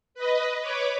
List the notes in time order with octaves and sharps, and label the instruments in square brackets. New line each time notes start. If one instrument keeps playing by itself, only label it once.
[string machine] B4 D#5
B4 C#5 D6